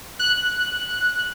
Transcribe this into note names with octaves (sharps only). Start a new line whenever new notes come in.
F#6